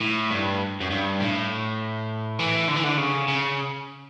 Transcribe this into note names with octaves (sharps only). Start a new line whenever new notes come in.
A2
G2
F#2
G2
A2
E3
D3
E3
D3
C#3
C#3